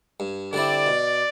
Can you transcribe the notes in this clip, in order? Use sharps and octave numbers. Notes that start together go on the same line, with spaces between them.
G2
D3 G3 C4 E4 D5
B2